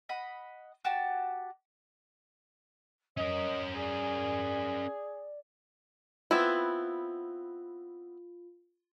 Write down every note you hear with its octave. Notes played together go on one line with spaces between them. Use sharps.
D#5 F#5 B5
F#4 G4 A5
C#4 A#4 C#5 D#5
G#4 D5
B3 C4 E4 F4